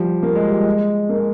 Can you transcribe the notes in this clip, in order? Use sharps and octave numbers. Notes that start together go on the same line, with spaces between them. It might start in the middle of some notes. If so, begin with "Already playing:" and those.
Already playing: F3 G3
A#3
G#3
G3
G#3
A#3
G#3